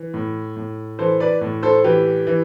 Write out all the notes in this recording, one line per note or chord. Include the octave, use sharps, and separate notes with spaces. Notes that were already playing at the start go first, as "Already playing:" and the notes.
Already playing: E3
A2
A2
E3 A4 C5
B4 D5
A2
A4 C5
E3 G4 B4
E3